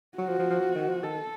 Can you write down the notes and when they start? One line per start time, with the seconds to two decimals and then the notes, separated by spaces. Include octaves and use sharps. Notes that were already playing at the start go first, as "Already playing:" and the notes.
0.18 F#3 F#4
0.28 F3
0.39 F3
0.50 F3
0.61 F3
0.75 D#3
0.88 F3
1.03 D#3 A4